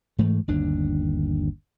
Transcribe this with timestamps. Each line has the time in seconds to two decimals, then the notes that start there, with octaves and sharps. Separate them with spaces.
0.19 G#2 E3 A3
0.48 G1 D#2 D4